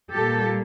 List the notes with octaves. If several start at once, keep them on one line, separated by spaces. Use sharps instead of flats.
A#2 G3 A#3 G4 A4